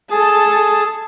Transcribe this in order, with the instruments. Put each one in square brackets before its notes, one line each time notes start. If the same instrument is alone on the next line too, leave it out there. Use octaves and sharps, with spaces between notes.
[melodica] G#4 [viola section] A4 A5